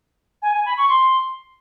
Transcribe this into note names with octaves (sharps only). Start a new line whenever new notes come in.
G#5
G#5
B5
C#6
C6